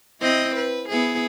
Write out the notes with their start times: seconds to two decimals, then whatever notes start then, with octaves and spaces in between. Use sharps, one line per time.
0.21 C4 E4 D#5
0.56 B4
0.89 B3 E4 G#4